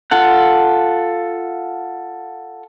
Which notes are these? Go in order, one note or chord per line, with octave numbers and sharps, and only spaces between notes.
F4 A4 F#5